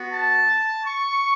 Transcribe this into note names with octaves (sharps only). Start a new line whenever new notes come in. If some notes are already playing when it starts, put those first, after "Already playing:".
Already playing: B3 F#4
A5
C#6